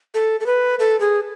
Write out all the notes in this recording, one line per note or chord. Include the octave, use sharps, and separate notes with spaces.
A4
A4
B4
A4
G#4